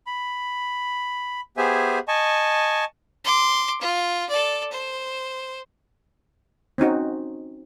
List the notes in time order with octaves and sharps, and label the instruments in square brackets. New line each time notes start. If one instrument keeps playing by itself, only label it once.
[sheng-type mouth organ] B5
B3 G4 G#4 C5 E5 G#5
D#5 G#5 A5 C#6
[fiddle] C6 D6
F4
A4 D5
C5
[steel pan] C4 C#4 D#4 F#4